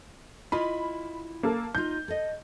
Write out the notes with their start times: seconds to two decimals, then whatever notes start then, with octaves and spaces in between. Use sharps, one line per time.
0.52 E4 F4 D#5 B5
1.43 A#3 A4
1.75 D#4 F4 G6
2.08 A4 D#5